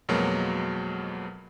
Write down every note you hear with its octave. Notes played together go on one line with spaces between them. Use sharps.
F2 B2 F#3 G#3 A#3